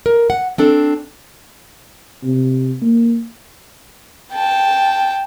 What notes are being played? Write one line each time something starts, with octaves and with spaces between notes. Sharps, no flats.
A#4
F#5
C4 D4 A4
C3
A#3
G5 A5